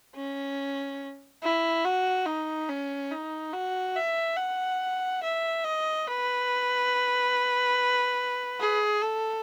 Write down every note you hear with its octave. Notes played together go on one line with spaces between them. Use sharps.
C#4
E4
F#4
D#4
C#4
D#4
F#4
E5
F#5
E5
D#5
B4
G#4
A4